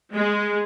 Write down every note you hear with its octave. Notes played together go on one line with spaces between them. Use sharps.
G#3